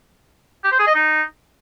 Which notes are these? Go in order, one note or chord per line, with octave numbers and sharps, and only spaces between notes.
G4
C5
G#4
D#5
D#4